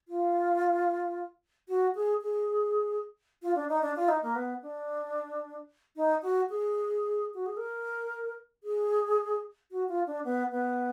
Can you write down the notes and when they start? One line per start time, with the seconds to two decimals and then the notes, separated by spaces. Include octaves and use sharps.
0.08 F4
1.68 F#4
1.95 G#4
2.22 G#4
3.42 F4
3.55 D4
3.69 D#4
3.82 D4
3.96 F4
4.08 D#4
4.23 A#3
4.35 B3
4.62 D4
5.96 D#4
6.22 F#4
6.50 G#4
7.34 F#4
7.46 G#4
7.57 A#4
8.64 G#4
9.71 F#4
9.88 F4
10.07 D4
10.24 B3
10.51 B3